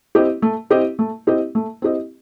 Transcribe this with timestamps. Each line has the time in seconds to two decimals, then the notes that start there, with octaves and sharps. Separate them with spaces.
0.15 C4 E4 G4 D#5
0.42 A3
0.70 C4 E4 G4 D#5
0.99 A3
1.27 C4 E4 G4 D#5
1.55 A3
1.82 C4 E4 G4 D#5